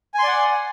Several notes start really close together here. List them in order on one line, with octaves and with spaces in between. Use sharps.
G#5 C6 D5 F#5